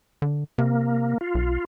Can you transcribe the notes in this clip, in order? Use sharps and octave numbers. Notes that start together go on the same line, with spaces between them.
D3
C3 A#3
F4
B1